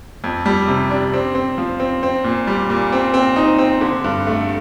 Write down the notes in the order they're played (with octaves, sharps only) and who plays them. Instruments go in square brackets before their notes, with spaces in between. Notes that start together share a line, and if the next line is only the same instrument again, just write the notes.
[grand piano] F2
G3
C3
D4
C4
C4
F3
C4
C4
A#2
G3
A#2
C4
C4
D#4
C4
D3
G2
A3